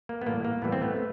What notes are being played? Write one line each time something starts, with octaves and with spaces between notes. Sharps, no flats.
A#3
B3
A2 E3 G3 A#3
A#3
A2 E3 G3 B3
C4
A3 B3
A3